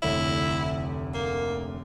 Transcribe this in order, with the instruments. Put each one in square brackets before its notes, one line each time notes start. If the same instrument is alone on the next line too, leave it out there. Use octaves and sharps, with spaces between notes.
[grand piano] F1 D2 C#5 [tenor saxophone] E4
[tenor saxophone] A#3